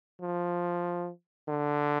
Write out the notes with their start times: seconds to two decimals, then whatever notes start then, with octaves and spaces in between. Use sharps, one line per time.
0.21 F3
1.48 D3